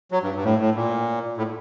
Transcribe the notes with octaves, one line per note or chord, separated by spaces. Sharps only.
F#3
G2
G2
A2
A2
A#2
A2